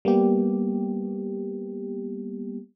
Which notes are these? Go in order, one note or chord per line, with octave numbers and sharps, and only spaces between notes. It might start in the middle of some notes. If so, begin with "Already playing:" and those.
G3 A#3 B3 G4